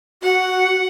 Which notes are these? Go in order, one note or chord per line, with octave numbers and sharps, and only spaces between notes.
F#4 F#5